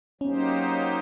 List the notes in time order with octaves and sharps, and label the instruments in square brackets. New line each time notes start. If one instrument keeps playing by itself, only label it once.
[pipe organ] F#3 A#3 D#4 G4 C5 [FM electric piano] C#4